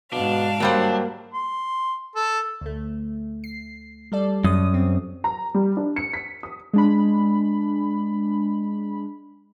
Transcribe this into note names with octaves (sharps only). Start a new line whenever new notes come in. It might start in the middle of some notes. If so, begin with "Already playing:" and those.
G#2 B2 D4 F5
F#3 G3 A#3 C5
C6
A4
D2 A3
C7
G3 A4 D5
F#2 D#6
C4
A#5
G3
D4
C#7
B6
D#6
G#3 D4 B5